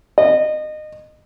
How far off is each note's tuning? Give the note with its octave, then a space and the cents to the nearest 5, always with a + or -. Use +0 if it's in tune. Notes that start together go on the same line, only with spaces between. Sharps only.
D#5 -25